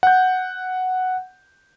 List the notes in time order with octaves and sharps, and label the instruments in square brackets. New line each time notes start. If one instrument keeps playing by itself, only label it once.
[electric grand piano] F#5 G6